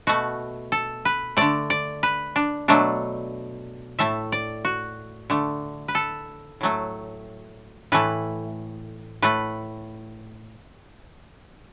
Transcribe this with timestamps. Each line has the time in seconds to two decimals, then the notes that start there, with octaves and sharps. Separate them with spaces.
0.07 B2 A3 F#4
0.72 A4
1.05 B4
1.37 D3 A3 D5
1.70 D5
2.03 B4
2.36 D4
2.68 B2 F#3 A3 D4
3.99 A2 A3 E5
4.32 D5
4.65 F#4
5.30 D3 A3
5.88 B4
5.95 A4
6.61 A2 F#3 A3
7.92 A2 E3 A3 B4
9.22 A2 A3 B4